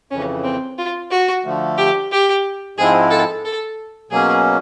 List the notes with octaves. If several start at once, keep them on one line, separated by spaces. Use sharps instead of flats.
F2 C#3 E3 C#4
C4
F4
F#4
D3 F3 A3
G4
G4
G#2 F3 G#3 C4 E4 G#4
A4
A4
B2 F#3 A#3 C#4 G#4